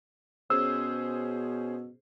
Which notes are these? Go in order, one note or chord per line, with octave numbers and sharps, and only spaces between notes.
B2 C#4 G#4 C5 E6